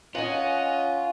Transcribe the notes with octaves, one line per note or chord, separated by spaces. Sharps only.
C#4 F4 D#5 F#5 G#5